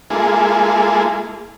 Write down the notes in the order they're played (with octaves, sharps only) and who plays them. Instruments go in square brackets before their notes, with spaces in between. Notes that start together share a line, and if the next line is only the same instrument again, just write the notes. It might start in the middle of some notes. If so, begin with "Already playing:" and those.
[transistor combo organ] G#3 A#3 E4 F4 G#4 A4